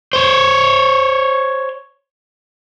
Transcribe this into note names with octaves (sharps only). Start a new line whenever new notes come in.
C5 C#5